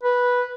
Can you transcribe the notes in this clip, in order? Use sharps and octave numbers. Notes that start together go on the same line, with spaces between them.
B4